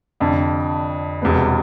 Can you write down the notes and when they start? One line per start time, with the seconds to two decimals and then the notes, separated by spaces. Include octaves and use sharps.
0.20 F1 F2 D3
1.22 E1 E2 C3 G#3 B3